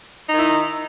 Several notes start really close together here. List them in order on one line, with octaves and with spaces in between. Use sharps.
D#4 D#3 E4